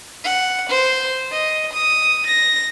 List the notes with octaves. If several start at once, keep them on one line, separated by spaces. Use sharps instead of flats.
F#5
C5
D#5
D#6
A#6